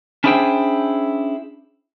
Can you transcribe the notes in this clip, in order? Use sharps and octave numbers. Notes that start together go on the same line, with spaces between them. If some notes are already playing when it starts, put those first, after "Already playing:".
C#4 D4 E4 G#4 C5 G5